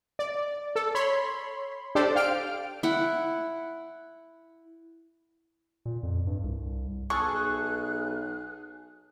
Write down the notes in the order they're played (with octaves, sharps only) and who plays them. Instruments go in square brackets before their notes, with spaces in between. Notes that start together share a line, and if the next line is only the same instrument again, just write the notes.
[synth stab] D5
A4
C#5 B5 C6
D4 G4 A4 C5 D5
F5 G5 F6 D7
[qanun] E4 F#5
[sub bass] A#2
F2
G2
C2
[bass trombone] B1 [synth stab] G#4 A4 [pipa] C#6 [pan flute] F#6